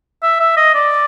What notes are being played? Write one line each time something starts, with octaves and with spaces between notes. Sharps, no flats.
E5
E5
D#5
D5